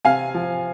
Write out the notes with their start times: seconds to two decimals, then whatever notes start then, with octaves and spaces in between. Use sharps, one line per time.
0.05 C3 F5 G#5
0.35 F3